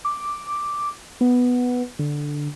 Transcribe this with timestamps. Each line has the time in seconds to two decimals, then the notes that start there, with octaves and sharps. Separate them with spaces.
0.05 D6
1.21 B3
1.99 D3